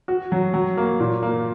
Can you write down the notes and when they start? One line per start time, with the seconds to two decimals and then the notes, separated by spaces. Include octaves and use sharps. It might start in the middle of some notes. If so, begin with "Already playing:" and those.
0.08 F#4
0.32 F#3
0.54 F#3
0.77 A#3
1.00 A#2
1.23 A#3